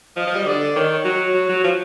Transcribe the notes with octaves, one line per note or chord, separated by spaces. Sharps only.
F3 D#5
F3
G3
D3 D5
D#3 C#5
F#3
F#3
F#3
F3